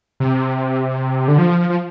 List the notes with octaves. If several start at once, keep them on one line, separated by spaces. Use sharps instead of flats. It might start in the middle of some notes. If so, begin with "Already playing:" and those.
C3
D3
F3
F3